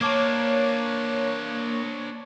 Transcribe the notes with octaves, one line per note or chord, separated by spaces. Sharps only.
A#3 D4 C5 C#5 A5 D6 G#6